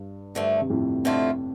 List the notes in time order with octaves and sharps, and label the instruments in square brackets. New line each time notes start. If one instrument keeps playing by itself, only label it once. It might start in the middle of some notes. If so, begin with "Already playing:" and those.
Already playing: [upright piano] G2
[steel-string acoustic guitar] D2 D3 A3 [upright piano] G2
[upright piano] C3
F2 A2
[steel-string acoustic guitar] F2 D3 A3 F4